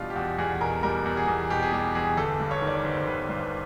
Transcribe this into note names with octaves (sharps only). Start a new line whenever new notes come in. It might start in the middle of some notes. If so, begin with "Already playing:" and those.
Already playing: E2 B2 G3 D4 F4
G4
E2 F#4
E2 G#4
B2 A#4
G3 A#4
E2
G#4
E2
B2 G4
G#4
G3 G4
E2 G#4
G1 A4
G2
C#5
D#3
D5
C#5
G1 C5
C5
G1 B4
G2 C5